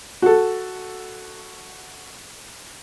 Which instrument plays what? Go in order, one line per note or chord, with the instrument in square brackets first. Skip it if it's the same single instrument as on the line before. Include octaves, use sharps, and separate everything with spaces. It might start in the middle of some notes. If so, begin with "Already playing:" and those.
[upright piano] F#4 A4